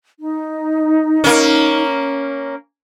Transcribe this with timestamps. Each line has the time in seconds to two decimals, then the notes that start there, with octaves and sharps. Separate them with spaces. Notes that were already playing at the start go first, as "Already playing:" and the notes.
0.19 D#4
1.24 A#3 C#4